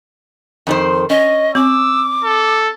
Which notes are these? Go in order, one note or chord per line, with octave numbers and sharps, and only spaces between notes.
F2 D#3 C5
C#4 D#5
C4 D6 E6
A4